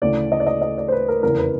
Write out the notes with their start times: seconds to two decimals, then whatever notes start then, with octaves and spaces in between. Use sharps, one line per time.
0.02 D2 C#3 E3 D5
0.32 D#5
0.40 D5
0.46 D#5
0.62 D#5
0.78 D5
0.88 C5
0.92 B4
1.08 A#4
1.23 F1 E2 C#3 A#4
1.38 B4